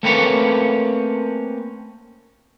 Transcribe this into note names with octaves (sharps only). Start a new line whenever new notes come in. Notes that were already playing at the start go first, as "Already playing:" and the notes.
A3 A#3 C4 C#4 B4 C#5